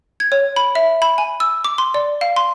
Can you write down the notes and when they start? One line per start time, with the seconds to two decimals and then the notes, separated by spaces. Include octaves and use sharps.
0.20 G#6
0.32 C#5
0.56 B5
0.75 E5
1.02 B5
1.18 G#5
1.40 E6
1.64 D6
1.78 C6
1.94 D5
2.21 F5
2.36 C6